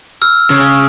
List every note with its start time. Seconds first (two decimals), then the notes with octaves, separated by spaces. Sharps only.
0.22 E6 F6
0.50 C#3